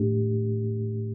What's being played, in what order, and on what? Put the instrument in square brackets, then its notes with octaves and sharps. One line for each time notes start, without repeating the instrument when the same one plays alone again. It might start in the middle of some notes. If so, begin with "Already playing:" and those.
Already playing: [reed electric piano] A2 A3 D4 G4